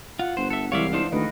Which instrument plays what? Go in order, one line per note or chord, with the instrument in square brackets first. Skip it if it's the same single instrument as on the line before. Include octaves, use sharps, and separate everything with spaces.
[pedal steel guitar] F4 [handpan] F#5
[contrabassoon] G1 [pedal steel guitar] C5
[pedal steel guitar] A4 E5
[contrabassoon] C2 [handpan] E3 G#3 F5 [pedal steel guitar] C#5 D5 E5
[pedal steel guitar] D4 D#4 C5
[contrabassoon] D2 [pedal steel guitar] D#3 [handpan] A3 B4 D#5